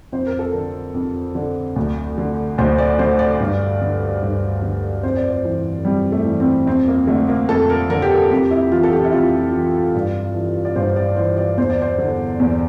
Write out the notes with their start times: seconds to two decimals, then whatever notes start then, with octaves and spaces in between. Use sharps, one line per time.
0.12 F2 C5
0.27 A#4
0.39 A4
0.52 D3 A#4
0.94 F2
1.35 D3
1.76 D2
2.18 D3
2.58 D2 C5
2.78 D5
2.99 D3 C5
3.19 D5
3.40 G2
3.81 D3
4.22 G2
4.62 D3
5.03 F2 C5
5.17 D5
5.30 C5
5.45 E3
5.85 F2 G3
6.12 A3
6.25 E3
6.40 C4
6.66 F2 C4
6.88 A#3
7.07 D3 A3
7.28 A#3
7.49 F2 A4
7.70 A#4
7.90 D3 A#4
8.02 G4
8.10 A4
8.31 F2 G4
8.51 E4
8.72 E3 F4
8.83 A4
8.92 G4
9.04 E4
9.12 F2 F4
9.53 E3
9.95 G2
10.35 E3
10.65 D5
10.76 G2 C5
10.96 D5
11.16 E3 C5
11.37 D5
11.57 E2 C5
11.70 D5
11.82 C5
11.98 D3
12.40 E2